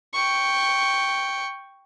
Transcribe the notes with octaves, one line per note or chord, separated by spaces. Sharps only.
G5 C#6